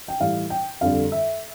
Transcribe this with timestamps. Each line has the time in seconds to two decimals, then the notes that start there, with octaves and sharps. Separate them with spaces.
0.08 G5
0.20 A2 E3 G3 F5
0.50 G5
0.81 F2 D3 G3 F5
1.12 E5